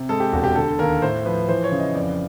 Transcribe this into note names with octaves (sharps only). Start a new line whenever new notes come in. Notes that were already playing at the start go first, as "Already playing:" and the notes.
Already playing: C3
G#3 A4
G4
E1 F#4
G4
D3 A4
D#2 A#4
A2 C5
F3 B4
E3 C5
C#5
C#3
D#5
F2 D5